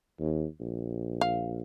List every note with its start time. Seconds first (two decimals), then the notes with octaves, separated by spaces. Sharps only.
0.20 D#2
0.60 A#1
1.21 F5